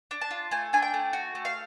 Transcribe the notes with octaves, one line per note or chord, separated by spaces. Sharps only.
D4
A5
F4
A3 G#5
D4 G#5
G5
A3
F#4
A3
F5